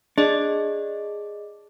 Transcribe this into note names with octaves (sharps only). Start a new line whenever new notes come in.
D4 G#4 D#5